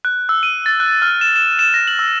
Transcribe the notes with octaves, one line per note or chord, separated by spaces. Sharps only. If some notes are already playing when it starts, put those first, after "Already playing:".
F#6
E6
D#7
A6
F#6
F6
E7
E7
E7
A#6
F#7
E6